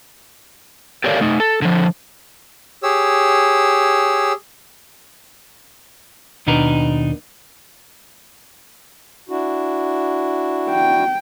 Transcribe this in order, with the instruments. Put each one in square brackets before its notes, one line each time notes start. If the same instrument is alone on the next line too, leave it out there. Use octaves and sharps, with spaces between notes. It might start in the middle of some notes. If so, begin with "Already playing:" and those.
[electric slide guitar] G4 A4 A#4 C#5 D5 F5
A3 D#4
A4
D3 F3
[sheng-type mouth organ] G4 G#4 C#5 E6
[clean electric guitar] D#2 B2 D4 D#4 A#4 B4
[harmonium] D4 E4 F#4
[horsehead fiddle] G5